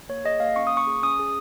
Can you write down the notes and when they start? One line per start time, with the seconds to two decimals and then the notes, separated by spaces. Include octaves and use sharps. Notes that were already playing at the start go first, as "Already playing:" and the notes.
0.09 A#3 C#5
0.25 G#4 D#5
0.40 A#3 F5
0.56 C#4 C#6
0.67 D#6
0.72 A#3
0.77 C#6
0.87 G#4
1.03 C#4 D#6
1.19 G#4